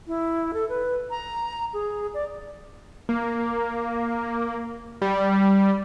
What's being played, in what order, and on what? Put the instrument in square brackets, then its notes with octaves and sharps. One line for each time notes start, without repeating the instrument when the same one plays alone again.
[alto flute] E4
A4
B4
A#5
G#4
D5
[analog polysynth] A#3
G3